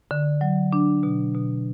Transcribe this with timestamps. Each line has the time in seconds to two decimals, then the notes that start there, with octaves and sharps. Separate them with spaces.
0.11 D3
0.41 F#3
0.73 D4
1.03 B2
1.35 B2